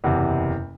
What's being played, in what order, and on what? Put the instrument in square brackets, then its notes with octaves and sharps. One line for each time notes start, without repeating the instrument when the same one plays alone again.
[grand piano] F#1 E2 C3